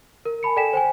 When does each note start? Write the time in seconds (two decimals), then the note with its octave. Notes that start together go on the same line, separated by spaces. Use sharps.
0.25 A#4
0.43 G#5 A5 B5 C#7
0.56 A4 D5 G5 G#5 B6 E7
0.73 C5 G5 G#5